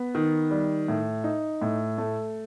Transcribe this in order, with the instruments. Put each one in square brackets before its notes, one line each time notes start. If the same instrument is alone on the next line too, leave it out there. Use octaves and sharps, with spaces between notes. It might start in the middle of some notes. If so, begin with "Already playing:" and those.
Already playing: [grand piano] B3
D#3
G3
A2
D#4
A2
A3